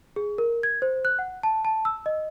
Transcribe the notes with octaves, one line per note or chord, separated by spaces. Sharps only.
G#4
A#4
G#6
C5
F#6
F#5
A5
A5
E6
D#5